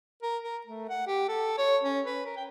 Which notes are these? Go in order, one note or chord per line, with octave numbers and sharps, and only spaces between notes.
A#4
A#4
A3
F#5
G4
A4
C#5
C#4
B4
A#4
G5